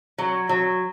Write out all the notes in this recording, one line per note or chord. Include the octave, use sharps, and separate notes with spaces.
F#3
F#3